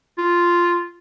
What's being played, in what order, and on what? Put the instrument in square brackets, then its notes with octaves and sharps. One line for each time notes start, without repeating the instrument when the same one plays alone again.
[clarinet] F4